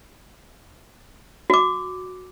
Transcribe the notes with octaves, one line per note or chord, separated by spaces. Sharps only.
F#4 D6